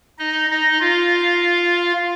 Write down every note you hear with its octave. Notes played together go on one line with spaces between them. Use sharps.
D#4 D#5
D#4 D#5
F4 F5